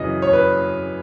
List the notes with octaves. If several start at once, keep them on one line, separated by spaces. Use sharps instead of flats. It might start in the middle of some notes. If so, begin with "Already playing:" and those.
Already playing: F#2 C#3 E3 D#5
C#5
B4